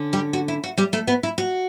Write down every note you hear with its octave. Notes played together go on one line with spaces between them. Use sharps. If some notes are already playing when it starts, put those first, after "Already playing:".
Already playing: D3 C#4
G3 G4
F#4
E4
F#4
G3 G4
A3 A4
B3 B4
E4
F#4